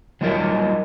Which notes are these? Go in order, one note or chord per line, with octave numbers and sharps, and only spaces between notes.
F#3 G3 D#4 F4 A#4 E5